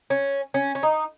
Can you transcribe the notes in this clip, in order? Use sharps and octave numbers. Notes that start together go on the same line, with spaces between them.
C#4
C#4
C#4
D#4